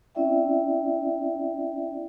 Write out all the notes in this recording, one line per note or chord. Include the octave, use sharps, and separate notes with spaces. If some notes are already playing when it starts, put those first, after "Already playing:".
C4 C#4 E4 D5 E5 G5